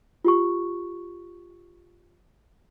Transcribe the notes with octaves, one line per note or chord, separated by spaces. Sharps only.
F4 G4 C#6